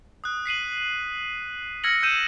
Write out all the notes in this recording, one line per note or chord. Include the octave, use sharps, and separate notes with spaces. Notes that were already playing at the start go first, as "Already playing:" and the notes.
D#6 F#6
B6 C7 D#7 F#7
E6 F6 G#6 A#6 C#7 F#7
E6 G6 C#7 D#7 E7